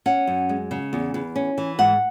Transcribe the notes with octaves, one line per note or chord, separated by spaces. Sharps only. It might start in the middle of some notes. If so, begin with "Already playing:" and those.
C#4 F#5
F#2
G#3
C#3
E2
E2
C#4
E3
G#2 F#5